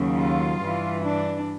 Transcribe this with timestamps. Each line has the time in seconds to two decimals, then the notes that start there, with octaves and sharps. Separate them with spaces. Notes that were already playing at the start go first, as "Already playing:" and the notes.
Already playing: D#2 C#3 F#3
0.17 F4
0.61 G2 E3
1.04 D4